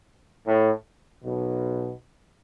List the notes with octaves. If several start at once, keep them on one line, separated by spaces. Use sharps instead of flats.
A2
B1 B2